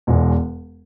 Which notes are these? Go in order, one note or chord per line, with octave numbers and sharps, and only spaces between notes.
E1 E2 B2 G#3